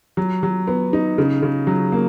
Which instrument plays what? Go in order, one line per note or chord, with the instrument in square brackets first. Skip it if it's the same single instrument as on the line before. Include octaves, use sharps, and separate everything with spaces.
[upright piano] F#3
F#3
B3
D#4
C#3
C#3
F#3
A#3